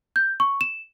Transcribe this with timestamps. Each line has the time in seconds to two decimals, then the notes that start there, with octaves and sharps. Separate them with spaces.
0.16 G6
0.40 C#6
0.61 E7